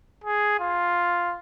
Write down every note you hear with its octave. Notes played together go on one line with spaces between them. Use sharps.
G#4
F4